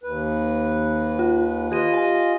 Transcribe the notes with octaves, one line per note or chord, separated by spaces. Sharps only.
D#2 B4
F4
F4 G4 D#5 D#7
G#5